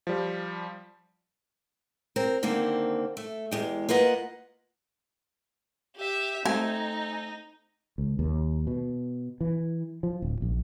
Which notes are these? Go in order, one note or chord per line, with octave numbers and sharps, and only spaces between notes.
F3 G3
C4 A#4
D3 D#3 A#3 C4
A3
E2 G#3 G4
A#3 F4 B4 D#5 F#5
G4 E5
A3 C4 D#4 G#5
C#2
D#2
B2
E3
F3
D1
A#1